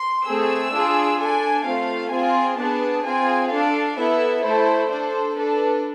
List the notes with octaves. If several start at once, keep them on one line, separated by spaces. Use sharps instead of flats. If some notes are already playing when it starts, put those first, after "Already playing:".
Already playing: C6
A3 C4 G#4 E6
D4 F4 G#4
D4 A4 G#5
A3 C4 F4 F5
C4 F4 G#4 G#5
B3 D4 G#4 A5
C4 F4 G#4 G#5
D4 A4 F5
B3 E4 A4 E5
A3 E4 A4 C5
D4 A4 C5
D4 A4 B4